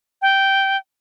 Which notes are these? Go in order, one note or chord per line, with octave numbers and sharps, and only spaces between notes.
G5